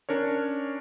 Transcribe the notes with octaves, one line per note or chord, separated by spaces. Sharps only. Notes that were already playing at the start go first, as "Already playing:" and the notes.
C#4 D4 A#4 C#5